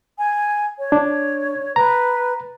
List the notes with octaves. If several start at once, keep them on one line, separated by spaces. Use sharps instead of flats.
G#5
C#5
D4
B4 A#5